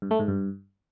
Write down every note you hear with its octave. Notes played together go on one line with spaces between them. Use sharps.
G2
A3
G#2
G2